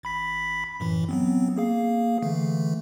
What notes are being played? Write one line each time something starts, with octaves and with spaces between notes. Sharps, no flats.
A1 B5 B6
F#2 A2 E3
F#3 B3 C4
A#3 G#4 F5
D3 E3 A3